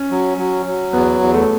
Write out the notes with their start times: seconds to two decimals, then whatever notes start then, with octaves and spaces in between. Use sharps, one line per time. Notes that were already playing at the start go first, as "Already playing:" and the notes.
Already playing: C#4
0.11 F#3
0.38 F#3
0.66 F#3
0.93 E2 B3
1.21 E2
1.34 A3